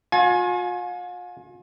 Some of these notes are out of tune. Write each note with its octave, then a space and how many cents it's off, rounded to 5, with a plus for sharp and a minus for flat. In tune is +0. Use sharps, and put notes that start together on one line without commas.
F4 +45 G#5 +25